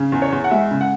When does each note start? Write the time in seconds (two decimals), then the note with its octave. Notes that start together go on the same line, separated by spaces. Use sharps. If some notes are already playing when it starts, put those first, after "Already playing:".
Already playing: C#3
0.12 E2
0.22 C#5
0.32 E2
0.44 F#5
0.51 G#3 E5
0.71 C#3
0.81 F#5